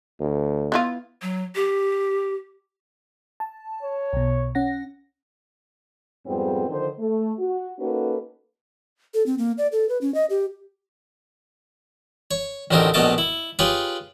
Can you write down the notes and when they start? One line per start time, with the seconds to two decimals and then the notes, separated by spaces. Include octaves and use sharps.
0.20 D2
0.72 B3 E4 F4
1.22 F#3
1.55 G4
3.40 A5
3.83 C#5
4.13 B1 B2
4.55 C#4 F#5 A#6
6.27 F2 G#2 G3 B3 C4 G#4
6.68 D3 D#3 F3 C5
6.99 A3
7.39 F#4
7.79 A#3 C#4 D#4 F#4 A4 B4
9.14 A4
9.26 C4
9.38 A#3
9.58 D5
9.72 A4
9.89 B4
10.01 C#4
10.14 D#5
10.30 G4
12.31 C#5
12.71 A1 D2 A3 C4 D#4 A#4
12.94 A#1 B2 A3 D#5 A5 D6
13.18 E4
13.59 F4 G4 G#4 B4 C#5